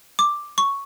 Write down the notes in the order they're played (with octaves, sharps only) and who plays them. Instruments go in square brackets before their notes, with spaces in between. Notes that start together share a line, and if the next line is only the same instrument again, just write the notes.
[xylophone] D6
C#6